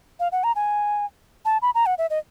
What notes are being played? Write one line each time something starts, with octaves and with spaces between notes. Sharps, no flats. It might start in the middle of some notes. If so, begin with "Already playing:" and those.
F5
F#5
A#5
G#5
A5
B5
A#5
F#5
E5
D#5